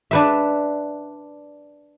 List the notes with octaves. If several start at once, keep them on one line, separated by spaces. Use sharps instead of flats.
D4 B4 E5